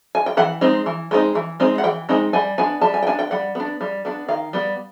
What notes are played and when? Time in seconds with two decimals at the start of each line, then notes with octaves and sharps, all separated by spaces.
0.15 G#5
0.26 G5
0.37 E3 F#5
0.61 G#3 C4 D#4
0.86 E3
1.11 G#3 C4 D#4
1.35 E3
1.60 G#3 C4 D#4
1.78 F#5
1.83 E3 G5
2.09 G#3 C4 D#4
2.33 G3 G#5
2.58 B3 D4 G#5
2.81 G3 A5
2.94 G#5
3.03 G5
3.06 B3 D4 G#5
3.19 G5
3.31 G3 F#5
3.55 B3 D4
3.81 G3
4.05 B3 D4
4.28 D#3 F5
4.53 G3 B3